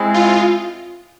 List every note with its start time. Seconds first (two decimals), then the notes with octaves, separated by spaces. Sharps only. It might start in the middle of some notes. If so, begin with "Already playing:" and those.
Already playing: G#3 C4 E4
0.14 F4